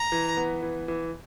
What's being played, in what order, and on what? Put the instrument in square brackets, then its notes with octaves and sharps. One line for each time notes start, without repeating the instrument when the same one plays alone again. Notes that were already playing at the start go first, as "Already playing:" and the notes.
Already playing: [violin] A#5
[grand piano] E3
B3
E3
E3